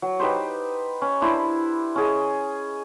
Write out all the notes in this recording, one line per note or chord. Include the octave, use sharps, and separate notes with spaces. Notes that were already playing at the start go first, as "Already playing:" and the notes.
F#3
D#4 G4 B4 C5
C#4
D4 E4 C5 B5
C#4 G#4 D#5